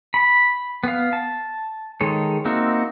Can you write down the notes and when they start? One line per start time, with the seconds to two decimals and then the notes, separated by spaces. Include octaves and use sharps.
0.14 B5
0.84 B3 F5
1.13 A5
2.01 D#3 G#3 A4 C#5
2.45 A#3 C4 D#4 F#4 E5